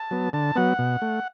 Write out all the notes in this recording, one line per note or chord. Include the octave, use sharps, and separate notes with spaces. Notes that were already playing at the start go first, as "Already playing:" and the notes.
Already playing: A5
F#3 B3
D3 A5
F#3 B3 F#5
B2
A3